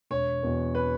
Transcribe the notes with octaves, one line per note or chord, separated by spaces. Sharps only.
E1 C#5
E2 B2
B4